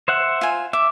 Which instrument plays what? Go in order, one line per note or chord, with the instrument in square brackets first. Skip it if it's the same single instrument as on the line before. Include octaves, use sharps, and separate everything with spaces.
[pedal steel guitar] C5 E5 F#5
[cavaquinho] F4 G#5
[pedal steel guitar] E5 [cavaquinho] D6